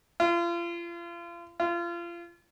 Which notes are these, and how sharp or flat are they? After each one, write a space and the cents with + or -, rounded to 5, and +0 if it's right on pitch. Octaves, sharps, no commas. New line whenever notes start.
F4 -35
F4 -30